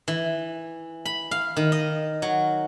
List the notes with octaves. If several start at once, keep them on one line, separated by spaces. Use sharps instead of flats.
E3
B5
F5
D#3
D#5
F#3